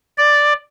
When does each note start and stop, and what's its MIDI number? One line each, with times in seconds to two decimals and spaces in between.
0.18 0.54 74